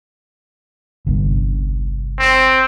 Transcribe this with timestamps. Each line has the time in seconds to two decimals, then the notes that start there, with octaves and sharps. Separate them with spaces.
1.06 G1 C2 G2
2.19 C4